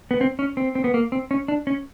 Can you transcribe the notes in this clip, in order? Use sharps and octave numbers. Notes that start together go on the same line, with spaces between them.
B3
C4
C#4
C4
C4
B3
A#3
C4
C#4
D4
C#4